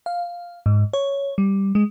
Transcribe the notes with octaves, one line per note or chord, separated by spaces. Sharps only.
F5
G#2
C#5
G3
G#3